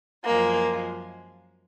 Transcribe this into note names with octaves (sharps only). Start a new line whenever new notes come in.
F#2 F3 G#3 A#3